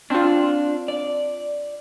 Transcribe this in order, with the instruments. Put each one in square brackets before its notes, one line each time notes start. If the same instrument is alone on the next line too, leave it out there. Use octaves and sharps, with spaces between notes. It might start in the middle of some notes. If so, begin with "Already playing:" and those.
[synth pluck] C4 F4 [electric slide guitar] D4
[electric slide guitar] D5